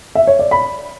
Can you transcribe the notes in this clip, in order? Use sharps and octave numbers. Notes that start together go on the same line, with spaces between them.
E5
C#5
D5
B5